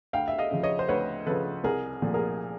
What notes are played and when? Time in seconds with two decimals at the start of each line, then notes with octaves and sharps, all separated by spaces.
0.13 D2 F5 G5
0.28 E5
0.38 D#5 F5
0.51 C#3 F3
0.63 C#5 D#5
0.79 C5
0.88 D2 B4 C#5
1.26 C#3 F3 A4 B4
1.64 C2 G#4 A#4
2.02 A#2 F3 A3
2.14 G#4 A#4